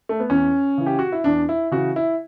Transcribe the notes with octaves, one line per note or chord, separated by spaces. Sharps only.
A3
B3
E2 C#4
C#3 E3
G4
F#4
E4
E2 D4
E4
C#3 E3 F#4
E4